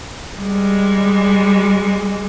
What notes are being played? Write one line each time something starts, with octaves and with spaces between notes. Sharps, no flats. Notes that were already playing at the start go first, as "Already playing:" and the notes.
G3 G#3